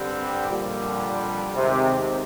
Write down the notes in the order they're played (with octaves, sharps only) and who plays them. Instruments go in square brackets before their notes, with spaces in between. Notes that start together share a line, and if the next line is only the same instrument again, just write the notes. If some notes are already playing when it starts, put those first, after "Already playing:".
Already playing: [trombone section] G2 D3 G3 C4 G4
[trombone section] F2 D3 G3 [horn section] A#2
[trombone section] D#2 D#3 G#3 D#4 G4 [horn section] C3